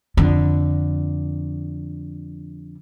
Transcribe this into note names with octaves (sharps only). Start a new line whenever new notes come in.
F2 D3